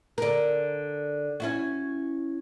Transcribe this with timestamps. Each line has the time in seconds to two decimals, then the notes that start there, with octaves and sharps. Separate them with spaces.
0.18 D3 A#4
1.40 C#4 E4 F#4